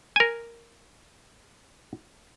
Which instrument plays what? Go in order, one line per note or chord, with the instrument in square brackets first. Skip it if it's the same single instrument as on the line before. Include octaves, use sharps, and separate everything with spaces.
[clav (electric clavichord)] A#4 G#5